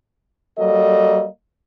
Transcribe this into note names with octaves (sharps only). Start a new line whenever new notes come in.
F#3 G3 A#3 A4 D#5